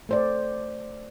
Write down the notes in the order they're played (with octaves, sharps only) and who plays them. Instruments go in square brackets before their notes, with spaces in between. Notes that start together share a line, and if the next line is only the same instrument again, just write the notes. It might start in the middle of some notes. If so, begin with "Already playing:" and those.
[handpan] A3 C5 D5